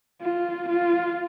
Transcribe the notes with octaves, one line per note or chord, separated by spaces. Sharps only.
F4
F4